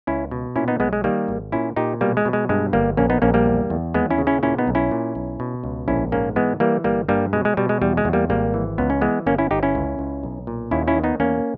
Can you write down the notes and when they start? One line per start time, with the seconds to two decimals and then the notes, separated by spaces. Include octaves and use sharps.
0.07 C#2 C#4 E4
0.31 B2
0.56 A#2 C#4 E4
0.68 B3 D#4
0.80 B1 G#3 B3
0.93 G#3
1.04 D#3 G3 A#3
1.28 G#1
1.52 A#2 C#4 E4
1.76 A#2 D#4 G4
2.01 B2 G3 A#3
2.17 G#3
2.25 B2
2.33 G#3
2.49 G2 G#3
2.73 G1 G3 A#3
2.97 A#1 A#3 C#4
3.10 B3 D#4
3.22 A#1 A#3 C#4
3.34 G3 A#3
3.46 E2
3.70 E2
3.94 D#2 G#3 B3
4.10 C#4 E4
4.18 C#3
4.27 C#4 E4
4.43 A#2 C#4 E4
4.58 B3 D#4
4.67 B1
4.75 C#4 E4
4.91 A#2
5.15 B1
5.40 B2
5.64 C#2
5.88 A#1 C#4 E4
6.12 G#2 A#3 C#4
6.36 E3 G#3 B3
6.60 E3 G3 A#3
6.84 G1 G3 A#3
7.08 G2 G3 A#3
7.33 B2 G#3
7.45 G#3
7.57 B2 G3
7.69 G#3
7.82 E2 G3
7.97 G#3
8.05 E2
8.13 G3 A#3
8.30 G#1 G3 A#3
8.54 E3
8.78 C#2 B3
8.90 C#4
9.01 E3 G#3 B3
9.26 G1 A#3 C#4
9.38 C#4 E4
9.51 G1 D#4 G4
9.63 C#4 E4
9.75 C#2
9.99 C#2
10.23 B1
10.47 A#2
10.71 D#2 C#4 E4
10.87 C#4 E4
10.96 D#3
11.04 B3 D#4
11.20 E2 A#3 C#4